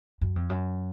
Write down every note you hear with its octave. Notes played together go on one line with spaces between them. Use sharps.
F#2
F2
F#2